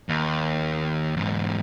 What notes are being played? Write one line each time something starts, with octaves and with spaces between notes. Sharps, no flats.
D#2
E2 G#2